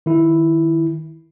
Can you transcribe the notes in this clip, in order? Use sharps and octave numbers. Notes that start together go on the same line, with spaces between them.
D#3 E4